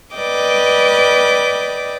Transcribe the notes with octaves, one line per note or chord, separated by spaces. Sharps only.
B4 D5 D#5 G5 D6